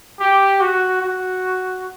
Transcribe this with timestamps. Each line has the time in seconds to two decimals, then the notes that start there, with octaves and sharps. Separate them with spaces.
0.20 G4
0.60 F#4
1.02 F#4